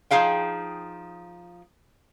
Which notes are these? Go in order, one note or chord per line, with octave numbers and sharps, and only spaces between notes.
F3 D#4 G#4 F5 G5